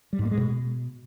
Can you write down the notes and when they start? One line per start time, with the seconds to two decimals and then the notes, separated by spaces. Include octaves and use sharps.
0.13 G3
0.19 G#2
0.25 A#3
0.31 G#3
0.37 B2